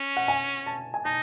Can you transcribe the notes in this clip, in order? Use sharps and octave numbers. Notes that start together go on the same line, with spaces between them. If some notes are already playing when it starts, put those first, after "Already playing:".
Already playing: C#4
F#5
G#5
A5
G#5
D#4 A5